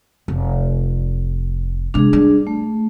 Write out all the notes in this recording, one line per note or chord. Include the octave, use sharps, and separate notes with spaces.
F1
C3 G#3 D4 G#4
G3
A3